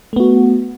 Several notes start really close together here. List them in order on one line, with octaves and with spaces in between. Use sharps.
A3 B3 F#4